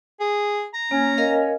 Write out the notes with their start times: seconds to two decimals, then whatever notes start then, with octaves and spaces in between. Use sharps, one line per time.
0.20 G#4
0.74 A#5
0.91 A#3 C#4
1.18 A#4 D#5 F5